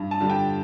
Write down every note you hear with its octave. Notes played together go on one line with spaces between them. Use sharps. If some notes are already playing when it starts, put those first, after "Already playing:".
Already playing: G2
A5
D3 G3
G5